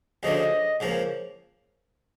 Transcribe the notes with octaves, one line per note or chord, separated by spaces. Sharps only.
D2 C#3 F3 A3 D4 D#5
D#5
C#2 C#3 F3 A#3